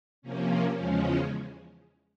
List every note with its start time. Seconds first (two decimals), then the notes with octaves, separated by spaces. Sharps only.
0.22 C3 F3 A#3 C#4
0.75 E2 C#3 F3 G#3 C#4